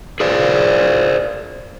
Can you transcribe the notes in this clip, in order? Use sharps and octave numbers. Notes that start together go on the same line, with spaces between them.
G#4 C5 D5